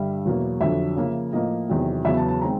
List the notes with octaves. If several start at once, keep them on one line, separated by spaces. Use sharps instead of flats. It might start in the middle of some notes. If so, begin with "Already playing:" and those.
Already playing: G2 D3 G3 E5
E2 B2 F#3 A#3
F2 D3 F#3 E5
C#3 F3 A#3
A2 F3 A#3 D#5
E2 C3 D#3 F#3
E2 C#3 F#3 B3 E5
A5
A5
D#3 G#3 C4 A#5